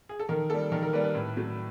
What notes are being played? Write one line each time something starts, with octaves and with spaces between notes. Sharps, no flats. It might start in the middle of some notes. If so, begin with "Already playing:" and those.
G#4
A4
D#3 A#4
G3 A#3 A4
D#3 A#4
A#4
G3 A#3 B4
B4
A2
F#3 A3